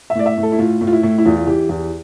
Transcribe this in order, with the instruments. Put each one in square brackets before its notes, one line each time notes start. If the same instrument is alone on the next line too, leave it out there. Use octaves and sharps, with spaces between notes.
[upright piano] E5
A2 D5
E5
A2
A4
E4
A2 F4
A2
F4
E4
A2
E4
E2 F4
F4
E3 G4
E2 G4